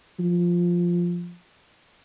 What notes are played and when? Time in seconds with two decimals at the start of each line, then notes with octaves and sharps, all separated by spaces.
0.20 F3